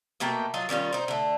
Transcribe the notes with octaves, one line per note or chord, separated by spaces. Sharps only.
B2 A3 A#3 G5
F#3 F4 D#5
D#3 G3 C#4 F4
D#4 C5
D3 A3